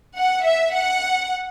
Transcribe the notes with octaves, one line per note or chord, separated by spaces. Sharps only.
F#5
E5
F#5